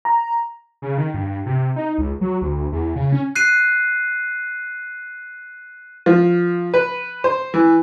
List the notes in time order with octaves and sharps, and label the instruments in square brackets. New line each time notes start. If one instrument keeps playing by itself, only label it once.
[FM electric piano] A#5
[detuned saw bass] C#3
D#3
G2
C3
D#4
C#2
F#3
D2
E2
C#3
C#4
[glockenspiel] F#6 C7 D#7
[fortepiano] F3
B4
C5
E3